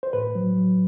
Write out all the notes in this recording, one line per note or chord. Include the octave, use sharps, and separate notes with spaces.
C5
A2 B4
F#3
F#3